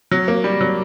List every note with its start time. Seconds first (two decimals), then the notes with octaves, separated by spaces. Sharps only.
0.11 F#3
0.28 A#3
0.44 G3
0.61 F#3